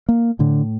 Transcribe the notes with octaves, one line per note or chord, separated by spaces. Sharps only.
A#3
A2 D3